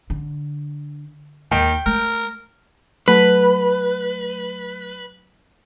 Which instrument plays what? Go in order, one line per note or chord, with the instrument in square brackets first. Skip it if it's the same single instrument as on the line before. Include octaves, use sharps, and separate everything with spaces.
[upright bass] D3
[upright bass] D#2 [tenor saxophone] D#3 [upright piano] G5
[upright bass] A3 [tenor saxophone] A#4
[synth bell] F#3 A3 B6 [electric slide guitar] B4